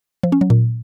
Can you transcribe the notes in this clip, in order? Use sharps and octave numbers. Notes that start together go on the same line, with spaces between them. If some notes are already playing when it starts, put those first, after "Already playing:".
F3
C#4
F#3
A#2